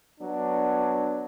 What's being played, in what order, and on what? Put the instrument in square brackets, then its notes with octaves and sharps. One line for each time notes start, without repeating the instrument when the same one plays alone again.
[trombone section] F#3 B3 D4